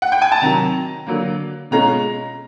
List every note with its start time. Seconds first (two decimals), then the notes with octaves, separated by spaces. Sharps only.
0.02 F#5
0.12 G5
0.22 G#5
0.32 A5
0.42 C3 D#3 F#3 A#5
1.07 D3 F#3 A#3
1.71 B2 G#3 C#4 F4 A#5